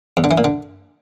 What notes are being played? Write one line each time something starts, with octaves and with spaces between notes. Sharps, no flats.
E2
D3
E3
A#2
D3